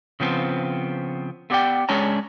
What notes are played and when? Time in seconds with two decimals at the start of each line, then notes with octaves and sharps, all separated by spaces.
0.20 C#3 F3 B3 C4
1.50 A3 B3 G4 D5 F#5 G5
1.89 G#3 C#4 D4 C#5 A#5